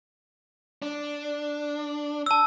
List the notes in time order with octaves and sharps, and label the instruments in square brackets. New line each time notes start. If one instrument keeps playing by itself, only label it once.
[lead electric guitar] D4
[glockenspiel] A5 E6